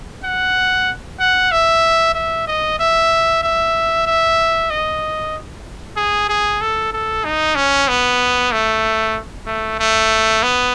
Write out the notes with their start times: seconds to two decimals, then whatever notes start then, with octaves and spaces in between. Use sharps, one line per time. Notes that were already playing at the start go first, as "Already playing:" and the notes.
0.24 F#5
1.20 F#5
1.51 E5
2.15 E5
2.47 D#5
2.80 E5
3.43 E5
4.06 E5
4.70 D#5
5.97 G#4
6.29 G#4
6.61 A4
6.93 A4
7.25 D#4
7.56 C#4
7.88 B3
8.52 A3
9.47 A3
9.79 A3
10.43 B3